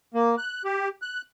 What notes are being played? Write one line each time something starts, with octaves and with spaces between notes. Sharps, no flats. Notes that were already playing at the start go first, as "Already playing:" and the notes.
A#3
F#6
G4
F#6